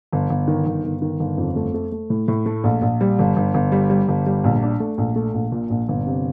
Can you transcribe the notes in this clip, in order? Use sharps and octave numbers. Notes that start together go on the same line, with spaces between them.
G1
G1
D#3
G1
G1
D#3
G1
F2
A3
A3
A3
A2
A2
A3
A#1
A#1
G3
G1
G1
G1
G3
G3
G1
G3
A#1
D4
A3
A#1
A3
A#1
A#2
A#1
G1
C3